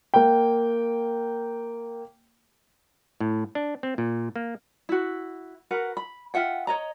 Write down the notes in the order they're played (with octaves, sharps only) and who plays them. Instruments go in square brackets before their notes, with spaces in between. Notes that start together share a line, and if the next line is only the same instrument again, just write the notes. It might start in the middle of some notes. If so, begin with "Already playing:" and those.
[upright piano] A#3 G5
[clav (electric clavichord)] A2
D4
C4
A#2
A#3
[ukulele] E4 F#4
F#4 A#4 B4 F#5
B5
F4 E5 F#5 G5
C#5 D#5 A#5